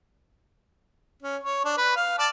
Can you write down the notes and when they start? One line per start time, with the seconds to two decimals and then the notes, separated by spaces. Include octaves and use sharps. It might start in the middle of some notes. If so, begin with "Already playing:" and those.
1.23 C#4
1.43 C#5
1.65 D4
1.77 B4
1.96 F5
2.19 D5 A5